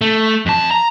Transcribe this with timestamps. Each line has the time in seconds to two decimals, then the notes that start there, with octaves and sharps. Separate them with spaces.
0.01 A3
0.46 F2 A5
0.71 A#5